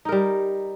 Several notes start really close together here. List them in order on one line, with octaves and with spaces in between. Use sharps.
D#4 A#4 G3